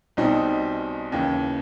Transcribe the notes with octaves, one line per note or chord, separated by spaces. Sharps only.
B1 B2 G3 C4 D#4
D#2 C#3 E3